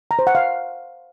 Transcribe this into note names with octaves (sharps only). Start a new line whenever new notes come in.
A#5
C5
F#5
F5